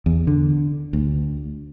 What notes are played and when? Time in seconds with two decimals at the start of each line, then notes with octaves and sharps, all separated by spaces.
0.06 E2
0.27 D3
0.93 D2